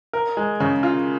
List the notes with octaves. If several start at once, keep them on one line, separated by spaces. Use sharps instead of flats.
A#4
G#3
C#3
F4